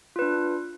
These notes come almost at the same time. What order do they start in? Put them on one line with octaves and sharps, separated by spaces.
F4 B4 D4